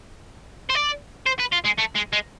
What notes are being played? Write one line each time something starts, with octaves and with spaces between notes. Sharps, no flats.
C5
D5
C5
B4
F4
G#3
A3
G#3
G#3